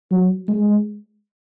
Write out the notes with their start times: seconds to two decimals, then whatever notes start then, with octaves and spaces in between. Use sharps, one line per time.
0.12 F#3
0.48 G#3